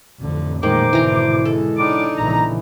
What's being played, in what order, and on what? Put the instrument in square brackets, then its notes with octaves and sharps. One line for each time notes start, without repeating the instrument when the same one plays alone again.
[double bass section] A1 F2 [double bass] D3
[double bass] A#2 G#3 [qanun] D#3 [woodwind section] C5 D6
[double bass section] G#1 [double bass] B2 D3 [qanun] E3 A#5 C6
[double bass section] G#3 [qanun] A4
[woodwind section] A2 D6 [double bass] D4 D#4
[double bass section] A#1 C#3 E3 [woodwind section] A#5